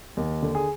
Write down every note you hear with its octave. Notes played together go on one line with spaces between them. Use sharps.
D#2
D3
G#4